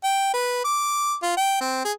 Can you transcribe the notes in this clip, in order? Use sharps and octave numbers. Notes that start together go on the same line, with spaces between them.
G5
B4
D6
F4
G5
C4
G#4